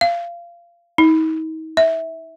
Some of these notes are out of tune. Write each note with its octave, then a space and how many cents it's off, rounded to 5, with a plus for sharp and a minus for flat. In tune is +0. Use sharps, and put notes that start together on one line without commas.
F5 -20
D#4 +40
E5 -15